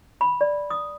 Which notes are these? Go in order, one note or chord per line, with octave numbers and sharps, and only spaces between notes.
B5
D5
D#6